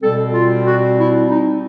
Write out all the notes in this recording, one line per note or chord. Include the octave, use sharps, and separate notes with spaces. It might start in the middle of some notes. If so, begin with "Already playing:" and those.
B2 G3 C4 A4
F4
F#4
E4
D#4